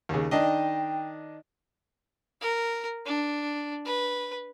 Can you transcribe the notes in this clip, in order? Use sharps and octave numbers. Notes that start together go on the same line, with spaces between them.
D#2 C#3
D#3 D4 D#5 G5
A#4
D4
B4